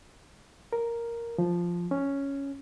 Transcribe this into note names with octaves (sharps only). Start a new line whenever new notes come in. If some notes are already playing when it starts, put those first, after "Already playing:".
A#4
F3
C#4